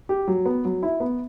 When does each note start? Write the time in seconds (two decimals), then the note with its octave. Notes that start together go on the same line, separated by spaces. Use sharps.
0.09 G4
0.28 F#3
0.46 B3
0.65 F#3
0.83 E4
1.00 B3